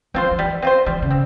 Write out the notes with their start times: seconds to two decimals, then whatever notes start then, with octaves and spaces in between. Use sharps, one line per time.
0.14 F3 C4 F4 C5
0.31 F3
0.38 E3 G3
0.62 C4 F4 C5
0.86 E3 G3
1.02 C#3
1.11 C4